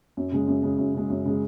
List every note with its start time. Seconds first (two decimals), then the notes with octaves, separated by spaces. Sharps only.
0.17 F#2
0.32 C#3 G#3
0.48 F#2
0.63 C#3 G#3
0.79 F#2
0.94 C#3 G#3
1.10 F#2
1.25 C#3 G#3